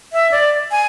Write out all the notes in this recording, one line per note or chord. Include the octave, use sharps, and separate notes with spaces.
E5
D5
G#5